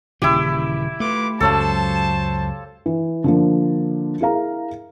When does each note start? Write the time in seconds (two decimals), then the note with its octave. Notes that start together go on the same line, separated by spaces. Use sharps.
0.22 D#1 C#3 E3 E4 G4
1.00 A3 F4 B4 D6
1.40 C#2 F#2 F#3 A4 C5 C#5 F5 A5
2.86 E3
3.24 D3 F3 A#3
4.21 E4 G#4 A#4 F5 A#5